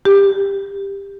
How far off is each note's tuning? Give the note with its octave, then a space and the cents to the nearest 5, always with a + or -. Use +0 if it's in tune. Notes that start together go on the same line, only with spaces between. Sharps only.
G4 +15